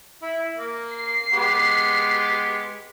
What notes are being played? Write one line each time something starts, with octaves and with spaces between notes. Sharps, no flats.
E4
A#3
C7
G#3 B3 G4